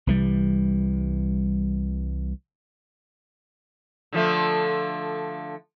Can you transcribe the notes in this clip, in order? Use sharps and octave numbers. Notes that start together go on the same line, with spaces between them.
C2 E3 G3
D3 F3 A3